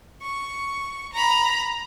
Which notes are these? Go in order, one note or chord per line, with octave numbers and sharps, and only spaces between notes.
C#6
A#5 B5